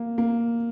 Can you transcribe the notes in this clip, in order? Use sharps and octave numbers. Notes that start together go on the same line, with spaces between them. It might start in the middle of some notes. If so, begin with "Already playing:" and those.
Already playing: A#3
A#3